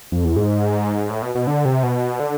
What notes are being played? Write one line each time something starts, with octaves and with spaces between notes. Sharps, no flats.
F2
E2
G#2
A2
B2
B2
D3
C3
B2
D3